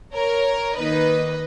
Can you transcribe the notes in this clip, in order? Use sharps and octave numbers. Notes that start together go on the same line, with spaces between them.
A#4 C#5
D#3 A#3 D#4 B4 D#5